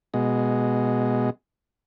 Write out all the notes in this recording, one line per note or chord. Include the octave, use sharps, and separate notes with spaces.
B2 G#3